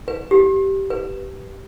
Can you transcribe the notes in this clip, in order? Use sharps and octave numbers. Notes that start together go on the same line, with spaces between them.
B4
G4
B4